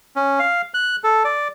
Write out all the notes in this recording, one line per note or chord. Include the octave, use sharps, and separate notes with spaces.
C#4
F5
F#6
A4
D5